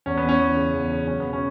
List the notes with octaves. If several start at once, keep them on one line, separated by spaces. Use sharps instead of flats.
E2 C#4
B3
E2
C#4
E3
C#3
E2
C#3
F#3 C#4
B3
B2
C#4